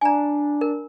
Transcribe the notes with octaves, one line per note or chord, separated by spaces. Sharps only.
D4 G#5 A#5
A#4